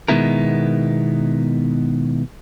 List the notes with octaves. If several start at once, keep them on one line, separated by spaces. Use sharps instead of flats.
B2 D#3 G#3 B3 E4 A#4